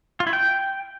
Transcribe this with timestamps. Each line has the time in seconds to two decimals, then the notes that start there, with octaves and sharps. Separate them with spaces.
0.20 F4
0.27 E4
0.33 G5